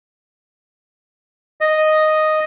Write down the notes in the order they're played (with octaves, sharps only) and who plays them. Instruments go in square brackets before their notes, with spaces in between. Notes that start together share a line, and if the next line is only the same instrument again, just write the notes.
[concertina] D#5